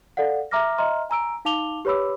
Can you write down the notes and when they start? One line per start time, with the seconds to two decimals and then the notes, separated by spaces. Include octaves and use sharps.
0.17 A4 D5 F5 F#5
0.51 E5 A#5 D6 F6 A#6
0.78 D#5 E5 A#5 C6 F6
1.10 G#5 A#5 E6 D7
1.45 D#4 F5 A5 D6 F7 G7
1.85 G4 B4 C#5 B5 D6 E6